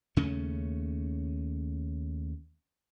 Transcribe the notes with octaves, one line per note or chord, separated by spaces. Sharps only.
D#2 C#3 A3 C#4